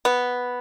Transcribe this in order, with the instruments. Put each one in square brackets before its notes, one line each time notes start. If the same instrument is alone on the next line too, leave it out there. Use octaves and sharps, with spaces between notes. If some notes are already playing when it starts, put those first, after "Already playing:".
[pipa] B3